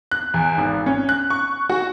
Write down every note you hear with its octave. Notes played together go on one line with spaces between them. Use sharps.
F#6
E2
G#1
C#4
F#6
C#6
F#4